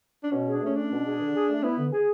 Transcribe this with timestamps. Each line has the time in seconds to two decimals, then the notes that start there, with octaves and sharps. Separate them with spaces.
0.23 D4
0.31 B2 C#4
0.47 G#4
0.54 D4
0.62 A3 C#4
0.76 C#4 D4
0.91 B2
1.05 G#4
1.20 D3
1.35 G#4
1.49 A3
1.63 B3 E4
1.78 D3
1.92 G#4